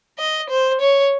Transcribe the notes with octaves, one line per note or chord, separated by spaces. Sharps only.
D#5
C5
C#5